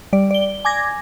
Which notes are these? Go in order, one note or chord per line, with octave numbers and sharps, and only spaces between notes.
G3 D5
D5 G7
G#5 D6 G#6 A#6